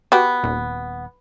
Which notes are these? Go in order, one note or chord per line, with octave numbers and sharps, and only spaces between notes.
B3 F#4 G4
D#1